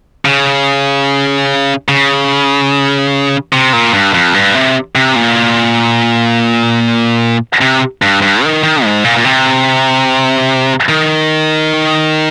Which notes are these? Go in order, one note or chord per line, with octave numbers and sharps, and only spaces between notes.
C#3
C#3
C3
A#2
G2
F2
G2
C3
C3
A#2
C3
G2
G2
D#3
D#3
G#2
A#2
A#2
C3
D#3